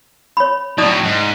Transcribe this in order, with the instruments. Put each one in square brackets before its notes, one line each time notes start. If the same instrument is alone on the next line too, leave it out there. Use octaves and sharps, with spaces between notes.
[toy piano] C#5 B5
[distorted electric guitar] A2 F#3 [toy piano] D#4 D5 D#6
[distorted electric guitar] G#2